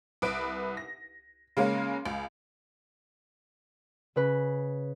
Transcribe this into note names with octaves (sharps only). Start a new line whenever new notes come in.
C2 B4 D7
A#6
C#3 G#3 A#3 C#4
C#2
C#3 B4